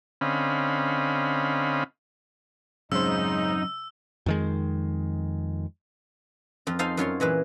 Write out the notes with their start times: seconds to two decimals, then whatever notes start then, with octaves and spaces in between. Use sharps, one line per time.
0.21 D3 C4 C#4 D#5 F5 B5
2.92 C#3 F#3 G#3 C4 C#4 D#4 C5 E6
4.26 F2 D#3 G#3
6.67 F2 F4
6.79 D#4 A4 C5 F5 G#5
6.97 F#2 F4 C#5 C6
7.20 A#2 E3 G#3 B4